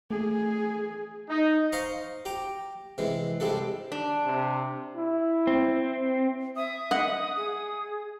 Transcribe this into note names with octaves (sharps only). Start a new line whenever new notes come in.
A3 G#4
D#4
C5 D#5 F5 A#5 C#6
G4 G5 A#5
C3 E3 G#3
C2 C3 G3 G#3 D4 A4
D4
C3
E4
C4
E5 D#6
D#5 F#5
G#4